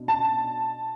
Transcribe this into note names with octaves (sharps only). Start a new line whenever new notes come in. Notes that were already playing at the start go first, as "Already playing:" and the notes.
Already playing: B2 D4
A5